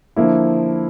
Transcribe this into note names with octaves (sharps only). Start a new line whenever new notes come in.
D3 F3 A#3 E4